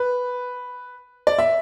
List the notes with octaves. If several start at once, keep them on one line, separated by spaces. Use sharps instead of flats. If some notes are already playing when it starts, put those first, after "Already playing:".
Already playing: B4
D5
E5